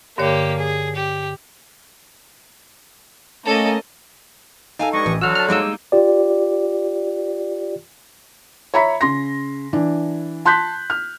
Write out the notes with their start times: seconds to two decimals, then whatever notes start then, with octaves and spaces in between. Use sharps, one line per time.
0.18 G2 D3 A#3 G4 C#5
0.58 G#4
0.96 G4
3.45 A3 A#3 C#4 A4 D#5
4.79 D#4 A4 F5 G#5 A#5
4.93 G2 G#3 D#5 C#6
5.06 A1 E3
5.21 D3 F#3 F#4 E6 F6
5.35 A5 F6
5.48 G3 G#3 A#3 D#4 E6
5.92 F4 G4 D5
8.74 C#5 E5 A#5 B5 B6
9.01 C#3 C6 A#6
9.73 E3 D4
10.45 A5 C6 F#6 G6 B6
10.90 F6